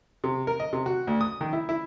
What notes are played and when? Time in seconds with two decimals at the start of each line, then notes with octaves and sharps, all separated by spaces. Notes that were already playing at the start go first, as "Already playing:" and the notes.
0.24 C3
0.47 A#4
0.60 D#5
0.73 C3
0.86 F#4
1.07 D2
1.21 D#6
1.41 D#3
1.53 E4
1.69 E4